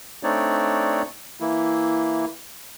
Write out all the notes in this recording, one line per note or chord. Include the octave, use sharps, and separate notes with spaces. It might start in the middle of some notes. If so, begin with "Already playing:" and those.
A3 C4 D4 D#4 C#5 D5
E3 A#3 E4